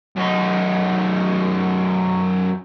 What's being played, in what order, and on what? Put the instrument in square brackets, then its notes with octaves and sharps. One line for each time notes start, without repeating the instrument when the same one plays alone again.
[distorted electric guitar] F#2 D#4